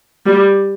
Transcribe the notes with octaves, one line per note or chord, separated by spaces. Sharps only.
G3